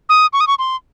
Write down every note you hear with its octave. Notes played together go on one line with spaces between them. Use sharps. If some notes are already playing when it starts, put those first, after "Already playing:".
D#6
C#6
D#6
C#6
C6